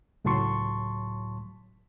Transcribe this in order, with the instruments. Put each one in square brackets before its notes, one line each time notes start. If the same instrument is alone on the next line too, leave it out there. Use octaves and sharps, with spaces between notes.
[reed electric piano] C#2 A2 F#3 A5 C6 C#6